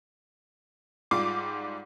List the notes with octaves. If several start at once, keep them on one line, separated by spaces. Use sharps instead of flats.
G#2 G3 F4 D6 C7